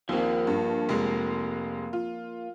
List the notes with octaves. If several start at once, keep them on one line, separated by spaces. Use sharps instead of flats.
D#2 F3 A#3 C4
G2
F1 G#3
F4